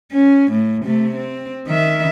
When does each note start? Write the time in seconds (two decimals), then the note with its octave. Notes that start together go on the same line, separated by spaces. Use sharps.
0.12 C#4
0.51 A2
0.85 C3 A3
1.16 C4
1.67 D#3 E5